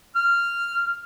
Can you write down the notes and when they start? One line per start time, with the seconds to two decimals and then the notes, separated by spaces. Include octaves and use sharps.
0.16 F6